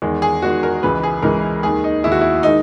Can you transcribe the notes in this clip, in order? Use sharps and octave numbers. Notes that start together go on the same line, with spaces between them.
E2 D#3 G#3
G#4
E2 D#3 G#3 F#4
A#4
C#2 C#3 E3 G#3 B4
G#4
C#2 C#3 E3 G#3 A#4
D#2 D#3 G#3 G#4
D#4
D#2 D#3 G#3 E4
F#4
E4
D#3 G#3 D#4